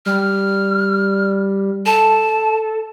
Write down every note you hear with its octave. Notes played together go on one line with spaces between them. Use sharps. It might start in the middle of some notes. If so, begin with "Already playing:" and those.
G3 F6
A4 A5